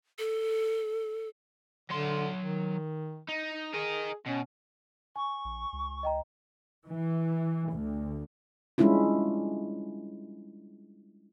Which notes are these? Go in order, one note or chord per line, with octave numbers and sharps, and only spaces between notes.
A4
D3 F#3 C6
D#3
D#4
G#4 A#4 D#5
B2 C#4
G#5 C#6
A#1
C#2
D#5 G5 A#5
E3
D2
G3 G#3 C#4 D4 E4 F4